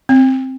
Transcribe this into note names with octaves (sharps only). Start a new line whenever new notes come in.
C4